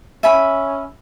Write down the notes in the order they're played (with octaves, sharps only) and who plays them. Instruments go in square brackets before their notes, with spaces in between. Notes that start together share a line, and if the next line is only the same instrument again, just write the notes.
[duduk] C#4 [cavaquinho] E5 G#5 B5